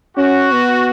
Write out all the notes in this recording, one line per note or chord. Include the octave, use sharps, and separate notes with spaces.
C#4 F#4
B3